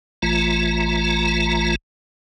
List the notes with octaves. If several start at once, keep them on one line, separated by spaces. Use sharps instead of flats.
A1 E3 A3 F4 A#5